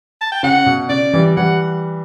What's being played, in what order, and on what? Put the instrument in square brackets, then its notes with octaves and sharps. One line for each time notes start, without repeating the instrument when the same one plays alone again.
[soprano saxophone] A5
G5
[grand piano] C#3 [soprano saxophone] F#5
[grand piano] B2
[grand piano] C#3 [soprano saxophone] D5
[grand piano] E3 G3
[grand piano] E3 G3 [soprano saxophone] F#5